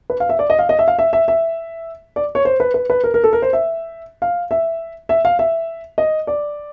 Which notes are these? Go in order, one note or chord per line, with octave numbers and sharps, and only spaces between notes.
B4
F5
E5
D5
D#5
F5
D#5
E5
F5
E5
E5
E5
D5
C#5
C5
B4
B4
B4
A#4
A#4
A4
A#4
C5
E5
F5
E5
E5
F5
E5
D#5
D5